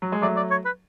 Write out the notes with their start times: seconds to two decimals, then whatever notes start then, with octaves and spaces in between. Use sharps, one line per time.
0.02 F#3
0.12 G#3
0.22 F#3 A3 D5
0.37 D5
0.51 C#5
0.65 B4